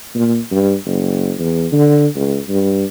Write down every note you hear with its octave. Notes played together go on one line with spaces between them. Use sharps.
A#2
G2
F#1
E2
D3
C#2
G2